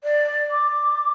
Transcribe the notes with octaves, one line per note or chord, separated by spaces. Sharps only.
D5
D6